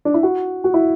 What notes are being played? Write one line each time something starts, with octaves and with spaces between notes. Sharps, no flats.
D4
E4
F#4
F#4
E4